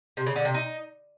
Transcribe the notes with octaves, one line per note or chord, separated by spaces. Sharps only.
C3
C#3
D3
C3
D#4